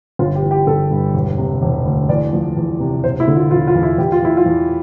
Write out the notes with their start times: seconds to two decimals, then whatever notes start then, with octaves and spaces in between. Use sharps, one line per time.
0.19 G1 F4
0.35 G4
0.43 E3
0.51 G4
0.67 G1 A4
0.91 G2
1.14 E1
1.38 C3
1.62 E1
1.86 D2
2.09 E2 D5
2.33 F3
2.57 E2
2.80 C3
3.04 E1 C5
3.20 E4
3.28 D3
3.36 F4
3.51 E1 F4
3.68 F4
3.75 E2
3.83 E4
3.98 E2 G4
4.12 F4
4.22 E3 E4
4.37 F4
4.46 E2